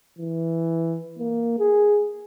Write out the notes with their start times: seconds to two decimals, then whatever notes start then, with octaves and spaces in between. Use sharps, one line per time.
0.18 E3
1.19 A#3
1.59 G#4